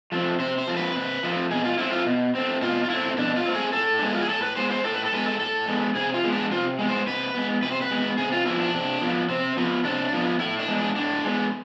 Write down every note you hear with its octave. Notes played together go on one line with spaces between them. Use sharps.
F3 A3 C4
C3 C5
C5
F3 A3 C4
B4
C3
F3 A3 C4
B2 G#4
F4
A3 C4 E4
F4
B2
A3 C4
B2 F4
F4
A3 C4 E4
B2 D4
F4
A3 C4
G#4
A2 A4
D4
G#3 B3 E4
F4
G#4
A2 A4
B4
G#3 B3 C5
C5
A2 A4
B4
A4
G#3 B3 B4
A4
A2 A4
G#3 B3
C3 G#4
F4
G#3 B3
D4
C3 F4
G#3 B3
C5
C3 B4
G#3 B3
C3 B4
C5
B4
G#3 B3
C3 G#4
F4
F3 B3 E4
D4
C3
F3 B3
C3 C4
F3 B3
C3 D4
F3 B3
A2 E4
D4
G#3 B3
D4
A2 D4
G#3 B3